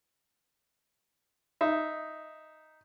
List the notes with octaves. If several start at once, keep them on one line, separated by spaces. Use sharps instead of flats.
D#4 E5